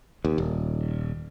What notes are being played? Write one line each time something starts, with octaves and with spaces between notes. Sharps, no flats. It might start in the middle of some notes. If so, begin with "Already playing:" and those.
D#2
D#1